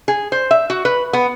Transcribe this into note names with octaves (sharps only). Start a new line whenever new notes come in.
G#4
C5
E5
F#4
B4
B3